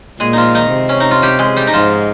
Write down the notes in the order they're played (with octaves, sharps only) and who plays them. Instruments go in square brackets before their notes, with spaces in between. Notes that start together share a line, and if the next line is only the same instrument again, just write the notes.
[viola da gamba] A#2 [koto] G#3 G#4
[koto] F3 D#4 F4
D#3 D#4
[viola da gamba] C3
[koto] C#4
D#4
F4
G3 G4
G#3 G#4
G3 G4
D#4
[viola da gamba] G#2 [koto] F3 F4